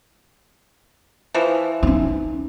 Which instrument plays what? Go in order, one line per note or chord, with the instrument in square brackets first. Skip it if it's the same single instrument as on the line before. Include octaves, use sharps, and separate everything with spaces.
[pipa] E3 F3
[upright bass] C#4 D#4